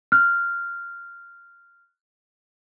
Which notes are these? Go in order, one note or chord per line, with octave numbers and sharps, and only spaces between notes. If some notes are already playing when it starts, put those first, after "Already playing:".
F6 F#6